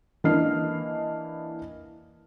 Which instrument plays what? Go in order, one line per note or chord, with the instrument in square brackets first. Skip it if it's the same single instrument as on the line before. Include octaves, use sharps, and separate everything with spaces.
[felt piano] E3 A#3 D4 D#5 F6 C7